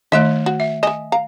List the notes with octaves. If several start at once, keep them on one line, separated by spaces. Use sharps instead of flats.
D#3 A3 D#4 E5
F#4
E5
D#5 E5 G#5
F5 A#5